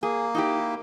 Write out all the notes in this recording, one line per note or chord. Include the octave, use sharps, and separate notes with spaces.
A#3 G#4
D#4 E4 G4